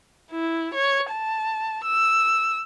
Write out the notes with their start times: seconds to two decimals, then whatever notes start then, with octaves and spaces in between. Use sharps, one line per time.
0.31 E4
0.74 C#5
1.11 A5
1.85 E6